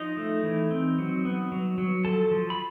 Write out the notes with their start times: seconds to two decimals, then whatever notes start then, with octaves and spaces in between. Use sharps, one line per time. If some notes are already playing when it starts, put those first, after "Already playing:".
Already playing: F3 D#4 D#5
0.17 A3
0.43 E3
0.71 C4
0.98 F#3
1.25 B3
1.52 F#3
1.78 F#3
2.05 F3 A4 A5
2.31 F3
2.50 B5